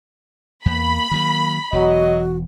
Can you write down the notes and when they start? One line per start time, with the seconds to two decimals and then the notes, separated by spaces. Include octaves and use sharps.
0.66 E2 A#3 B5
1.11 D#3 F3 F#3 A#3
1.73 E1 E2 F#3 F#4 D#5